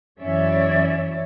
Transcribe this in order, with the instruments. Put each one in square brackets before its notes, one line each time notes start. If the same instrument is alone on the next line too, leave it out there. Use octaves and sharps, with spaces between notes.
[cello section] F#2 E3 C#4 C#5 D5 E5